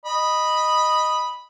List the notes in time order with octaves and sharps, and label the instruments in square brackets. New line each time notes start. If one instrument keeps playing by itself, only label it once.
[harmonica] D#5 B5